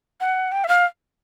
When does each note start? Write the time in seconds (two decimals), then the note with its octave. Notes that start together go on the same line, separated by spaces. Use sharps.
0.20 F#5
0.52 G5
0.64 E5
0.68 F5